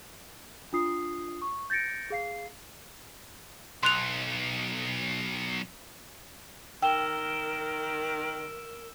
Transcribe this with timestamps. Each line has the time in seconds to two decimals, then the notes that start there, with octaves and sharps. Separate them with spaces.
0.73 D4 F4 D#6 C7
1.42 C#6
1.70 G6 A6 A#6 C#7 D7
2.10 G#4 F5 C7
3.83 B1 C6 F#6 F7
6.82 D#3 A#4 G5 E6 E7 G7